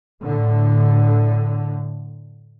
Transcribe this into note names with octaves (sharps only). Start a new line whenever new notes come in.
A2 D3